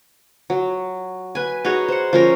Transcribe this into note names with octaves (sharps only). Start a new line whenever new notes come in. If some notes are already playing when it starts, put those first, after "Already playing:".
F#3
B4 G#5
D#4 F#4 G#4 C#5
C5 F#5
F3 C#4 A#4